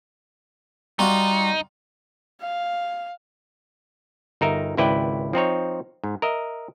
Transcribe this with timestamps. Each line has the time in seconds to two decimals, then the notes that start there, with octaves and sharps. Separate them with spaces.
0.99 G3 D#4 F4 F#4
2.41 F5
4.41 G1 D#4 A#4 E5
4.77 G#1 C#2 E4 B4 D5 G5
5.33 F3 C4 D#4 C#5
6.04 G#2
6.22 A#4 D#5 E5